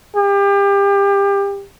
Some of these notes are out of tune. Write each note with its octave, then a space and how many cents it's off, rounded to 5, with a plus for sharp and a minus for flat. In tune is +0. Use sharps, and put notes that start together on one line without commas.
G4 +30